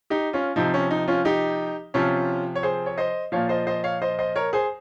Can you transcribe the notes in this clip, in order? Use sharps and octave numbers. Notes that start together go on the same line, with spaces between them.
D#4 G4
C#4 F4
C3 F3 D#4
C#4
D#4
C#4 F4
D#4 G4
C3 F3 C#4 F4
C#5
G#4 C5
C#5
C5 D#5
A#2 F3 C#5 F5
C5 D#5
C5 D#5
C#5 F5
C5 D#5
C5 D#5
A#4 C#5
G#4 C5